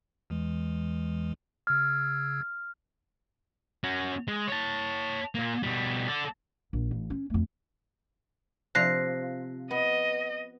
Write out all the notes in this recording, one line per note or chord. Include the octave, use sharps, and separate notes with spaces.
E2 E3 G#3
C#3 E6 F6 G#6
C#4 F#4
G#3
C#5 A5
A#2 A#3
B2 G3
A4 D5
A#1
A1
C#4
F2 A3
C3 F3 F4 F#6 A#6 C7
B3 D#5